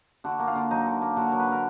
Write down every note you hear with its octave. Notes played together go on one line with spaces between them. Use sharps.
D3 F#4
A#3
F4
D3
F#3 D#4
D3
A#3
D3 F#4
F#3 A#4
B4
D3 A#4